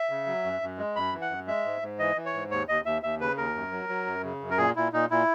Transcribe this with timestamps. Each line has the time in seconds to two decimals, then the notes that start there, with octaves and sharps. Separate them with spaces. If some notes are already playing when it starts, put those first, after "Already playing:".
Already playing: E5
0.10 C#3
0.26 F#3
0.44 F#2
0.61 F#2
0.78 G#3
0.96 F#2 B5
1.13 E3
1.21 F#5
1.30 F#2
1.47 G#3 E5
1.65 G#2
1.82 G#2
1.99 E3 D#5
2.16 E3
2.26 C#5
2.34 G#2
2.51 D#2 C#5
2.68 D#2 D#5
2.85 D#2 E5
3.03 D#2 E5
3.20 C#3 B4
3.37 D#2 A#4
3.54 F#2
3.72 F#3
3.89 F#3
4.07 F#2
4.24 C#3
4.41 F#2
4.50 A#4
4.58 A#2 G#4
4.76 A#2 E4
4.93 A#2 D#4
5.10 A#2 E4